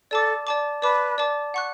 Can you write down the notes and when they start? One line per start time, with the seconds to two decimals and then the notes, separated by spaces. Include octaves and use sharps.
0.11 A4 D5 A5 D6
0.47 D5 A5 D6
0.82 B4 D5 A5 D6
1.18 D5 A5 D6
1.54 F#5 C#6 F#6